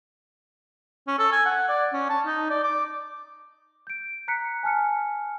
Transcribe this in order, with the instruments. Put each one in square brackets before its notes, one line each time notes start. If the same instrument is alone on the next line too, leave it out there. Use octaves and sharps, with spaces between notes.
[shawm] C#4
A4
G#5
F#5
D5
C#4
A5
D#4
D5
D6
[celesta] G6 D7
A#5 F#6 B6 C#7
G#5 A5 F6 C#7